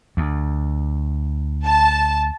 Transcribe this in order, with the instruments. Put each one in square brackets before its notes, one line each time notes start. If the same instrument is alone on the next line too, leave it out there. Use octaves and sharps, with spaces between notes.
[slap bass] D2
[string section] A5